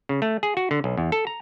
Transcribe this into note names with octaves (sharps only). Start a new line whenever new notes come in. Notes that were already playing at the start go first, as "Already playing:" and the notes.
C#3
A3
G#4
F#4
D3
B1
E2
A4
A#5